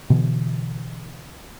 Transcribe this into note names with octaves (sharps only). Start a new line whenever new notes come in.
B2 D3 E3